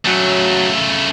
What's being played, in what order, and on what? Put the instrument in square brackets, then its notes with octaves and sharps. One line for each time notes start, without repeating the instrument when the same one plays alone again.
[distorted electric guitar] C#3 A3 [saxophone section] F#3